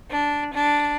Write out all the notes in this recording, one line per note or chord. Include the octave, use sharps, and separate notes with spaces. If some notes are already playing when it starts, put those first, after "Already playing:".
D4
D4